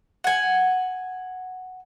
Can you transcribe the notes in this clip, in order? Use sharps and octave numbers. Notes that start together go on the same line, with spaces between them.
F#5 G#5